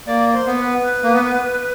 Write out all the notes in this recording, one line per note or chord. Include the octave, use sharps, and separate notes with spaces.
A#3 D5
C5
B3
B4
A#3
B3